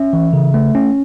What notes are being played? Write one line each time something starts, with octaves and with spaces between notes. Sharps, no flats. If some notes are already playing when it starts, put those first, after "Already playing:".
Already playing: C#4 E5
E3
C#3
A3
C#4